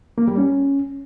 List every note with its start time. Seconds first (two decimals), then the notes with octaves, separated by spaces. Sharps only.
0.18 A#3
0.28 G3
0.37 C#4